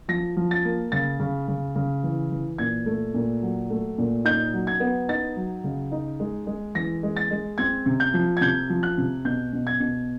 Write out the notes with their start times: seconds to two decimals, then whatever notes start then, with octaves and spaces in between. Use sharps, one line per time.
0.08 F3 A#6
0.37 F3
0.51 A6
0.65 A#3
0.92 C#3 A6
1.20 C#3
1.48 C#3
1.76 C#3
2.03 E3
2.32 E3
2.58 A#2 G#6
2.86 A3
3.14 A#2
3.42 F#3
3.70 A3
3.98 A#2
4.25 D#4 G6
4.54 F#3
4.67 G#6
4.80 B3
5.09 D#4 A6
5.36 F#3
5.64 C#3
5.92 D#4
6.20 G#3
6.47 G#3
6.75 E3 A#6
7.03 G#3
7.16 A6
7.31 G#3
7.58 C4 G#6
7.86 C3
8.00 G6
8.14 F3
8.37 G#6
8.41 C3 G6
8.70 F3
8.83 F#6
8.98 C3
9.25 B2 G6
9.53 B2
9.67 G#6
9.80 B2